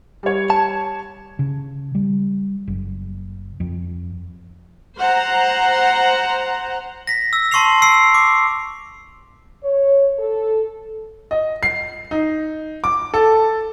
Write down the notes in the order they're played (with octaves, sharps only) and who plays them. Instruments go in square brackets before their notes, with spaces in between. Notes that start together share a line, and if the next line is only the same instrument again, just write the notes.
[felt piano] G3 C#5
[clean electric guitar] A5
[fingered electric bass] C#3
G3
F#1
F2
[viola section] C5 F#5 A#5
[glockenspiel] A#6 B6
E6
A5 C6 C#6 E6 C7 F7
E6 C7 D7
D6
[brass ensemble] C#5
A4
[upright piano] D#5
C7
D#4
D6
A4